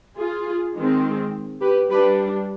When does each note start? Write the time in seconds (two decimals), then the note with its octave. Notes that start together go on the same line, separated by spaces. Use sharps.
0.17 F4 G#4
0.75 D#3 G#3 C4
1.61 G4 B4
1.90 G3 D4 G4 B4